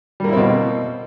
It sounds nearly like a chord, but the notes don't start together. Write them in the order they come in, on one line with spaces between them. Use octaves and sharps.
G3 A#3 E4 C4 B2